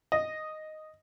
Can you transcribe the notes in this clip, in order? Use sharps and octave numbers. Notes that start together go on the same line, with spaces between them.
D#5